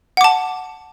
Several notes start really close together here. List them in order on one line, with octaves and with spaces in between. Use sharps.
F#5 D6 A5